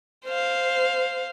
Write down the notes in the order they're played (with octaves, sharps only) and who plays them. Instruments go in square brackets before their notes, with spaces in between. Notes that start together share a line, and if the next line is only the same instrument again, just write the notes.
[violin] C5 F5